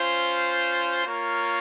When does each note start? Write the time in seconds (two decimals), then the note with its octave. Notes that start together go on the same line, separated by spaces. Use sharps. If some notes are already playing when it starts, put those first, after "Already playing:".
Already playing: C#4 F4 C5
1.05 A#3 F4 A#4 C#5